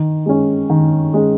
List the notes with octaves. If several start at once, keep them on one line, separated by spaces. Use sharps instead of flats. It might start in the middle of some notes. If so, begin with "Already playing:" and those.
Already playing: D#3
G#3 C#4
D#3
G#3 C#4